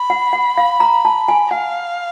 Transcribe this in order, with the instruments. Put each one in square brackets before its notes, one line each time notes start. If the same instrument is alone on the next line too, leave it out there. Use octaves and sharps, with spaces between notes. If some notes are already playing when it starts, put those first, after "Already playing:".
Already playing: [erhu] B5
[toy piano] F#5
F#5
F5
A#5
A5
G#5
[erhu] F5 [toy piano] F#5